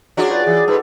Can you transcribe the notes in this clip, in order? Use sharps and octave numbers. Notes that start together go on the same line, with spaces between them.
F#3 C#4 D4 F4 F#4 G#4 D5
B4 D5 F#5 G5
E3 G#4
G#2 A4 B4